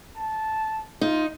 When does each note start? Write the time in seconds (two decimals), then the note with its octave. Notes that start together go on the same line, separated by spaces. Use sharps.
0.17 A5
1.01 D#4 F4